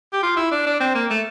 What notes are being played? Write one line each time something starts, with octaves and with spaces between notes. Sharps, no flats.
G4
F4
E4
D4
D4
C4
A#3
A3